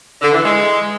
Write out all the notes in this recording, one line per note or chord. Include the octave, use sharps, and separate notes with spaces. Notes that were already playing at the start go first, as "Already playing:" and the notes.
D3
E3
G#3